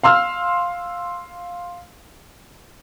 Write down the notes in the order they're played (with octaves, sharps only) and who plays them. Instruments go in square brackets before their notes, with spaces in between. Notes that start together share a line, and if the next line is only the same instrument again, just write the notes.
[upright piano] F5 C6 E6 F6